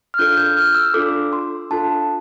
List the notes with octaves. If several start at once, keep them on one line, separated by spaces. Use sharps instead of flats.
F6
D4 F4 A4 G6
G6
F6
E6
D4 F4 A4 D6
C6
D4 F4 A4 A5